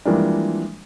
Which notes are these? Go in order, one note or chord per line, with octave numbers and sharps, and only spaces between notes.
E3 F3 G3 G#3 A#3 D4